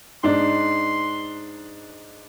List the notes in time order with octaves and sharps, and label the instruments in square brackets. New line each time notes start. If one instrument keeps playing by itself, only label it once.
[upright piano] G#2 D4 D#4 [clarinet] C6